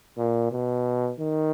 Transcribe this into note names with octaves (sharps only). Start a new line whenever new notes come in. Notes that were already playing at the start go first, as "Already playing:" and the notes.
A#2
B2
D#3